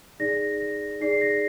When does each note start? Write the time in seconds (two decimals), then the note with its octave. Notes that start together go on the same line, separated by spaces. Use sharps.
0.20 D#4 G#4 D5 A#6
0.60 A#6
1.00 D#4 G#4 D5 C7
1.11 C7
1.21 A#6